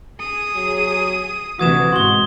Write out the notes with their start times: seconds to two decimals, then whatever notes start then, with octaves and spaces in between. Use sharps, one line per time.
0.20 G#4 D#6
0.56 F#3
1.59 D2 C3 E3 F#4 D#6 G#6 E7
1.92 G#2 B2 F#4 C6 G7